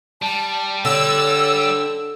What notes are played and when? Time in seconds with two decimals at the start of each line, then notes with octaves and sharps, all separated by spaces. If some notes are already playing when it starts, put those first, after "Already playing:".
0.22 G3 A5
0.85 D3 C#5 E6